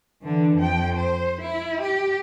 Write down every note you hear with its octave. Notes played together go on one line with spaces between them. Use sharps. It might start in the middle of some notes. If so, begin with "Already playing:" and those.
D3 E3
F2 G5
C5
E4
G4